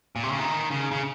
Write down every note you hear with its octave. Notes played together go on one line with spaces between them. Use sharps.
A#2
C3
C#3
D#3
C#3
C#3